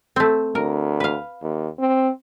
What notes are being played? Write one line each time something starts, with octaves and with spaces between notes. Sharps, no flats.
A3 C4
D2 A#4
B4 F5
D#2
C4